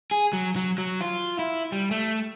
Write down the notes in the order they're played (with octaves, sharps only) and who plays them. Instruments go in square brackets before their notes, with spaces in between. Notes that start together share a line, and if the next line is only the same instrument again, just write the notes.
[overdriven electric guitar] G#4
F#3
F#3
F#3
F4
E4
G3
A3